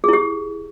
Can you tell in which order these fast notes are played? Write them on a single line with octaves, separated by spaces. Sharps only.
G#4 E4 G4